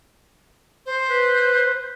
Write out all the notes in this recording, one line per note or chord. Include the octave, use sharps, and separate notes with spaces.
C5
B4